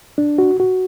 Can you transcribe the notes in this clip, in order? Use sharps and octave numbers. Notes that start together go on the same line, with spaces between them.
D4
F#4
F#4